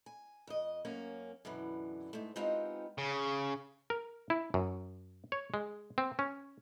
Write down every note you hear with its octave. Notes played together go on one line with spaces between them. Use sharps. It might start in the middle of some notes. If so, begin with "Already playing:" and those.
G#5
F2 D#5
F#2 A#3 C#4 G#5
F#2 B2 D3 E3
G#2 A3
G#3 B3 C4 D#4 F4 G4
C#3
A#4
E4
F#2
C#5
G#3
C4
C#4